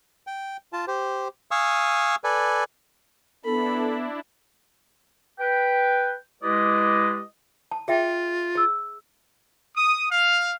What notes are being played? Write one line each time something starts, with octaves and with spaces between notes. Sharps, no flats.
G5
F4 A5
G4 C5
F5 G#5 C#6 D#6 E6
A4 B4 D5 G#5
B3 D4 E4 A4 B5
B4 G5
G#3 E4 G4 B4 D5 D#5
A5
F4 G#4 E5 G5
G#4 E6
D#6
F5